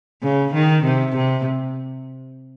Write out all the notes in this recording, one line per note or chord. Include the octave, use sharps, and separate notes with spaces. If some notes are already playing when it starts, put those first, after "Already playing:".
C#3
D#3
C3
C3